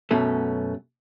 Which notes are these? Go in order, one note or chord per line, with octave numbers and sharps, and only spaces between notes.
F#2 B2 A3 C#4